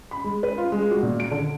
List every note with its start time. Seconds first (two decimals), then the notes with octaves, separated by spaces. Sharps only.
0.11 B5
0.24 G#3
0.43 B4
0.58 F4
0.72 G#3
0.91 F#4
1.03 A#2
1.20 D7
1.31 D3